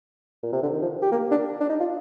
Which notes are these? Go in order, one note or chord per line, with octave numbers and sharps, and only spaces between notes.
A#2
C3
D3
D#3
F3
G4
A#3
D4
D4
D#4
F4